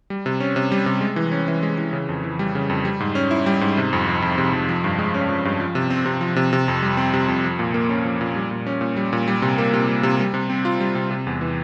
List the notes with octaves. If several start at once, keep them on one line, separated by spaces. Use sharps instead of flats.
G3
C3
C#4
C3
G3
C3
G#3
E3
C#4
E3
G#3
E3
C#3
F2
E3
G3
C#3
F2
G3
G#2
C#4
E4
G3
G#2
C3
F2
F3
F2
C3
F2
F3
G2
G#3
C#4
F3
G2
F3
C3
C4
C3
F3
C3
C3
F2
G3
C4
C3
F2
F3
A#2
A#3
C#4
F3
A#2
G3
A#2
C#4
A#2
G3
A#2
G3
C3
A#3
C3
G3
C3
G3
C3
C4
F4
G3
C3
C3
E2
E3